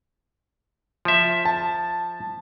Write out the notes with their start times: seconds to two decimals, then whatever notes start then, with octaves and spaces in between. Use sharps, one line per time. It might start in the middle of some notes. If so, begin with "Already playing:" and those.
1.05 F3 E5
1.45 A5